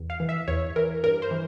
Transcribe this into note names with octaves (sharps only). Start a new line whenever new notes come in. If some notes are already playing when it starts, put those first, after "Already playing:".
Already playing: E2
F5
E3
E5
E2 C#5
E3 A#4
G2 A#4
C5
E3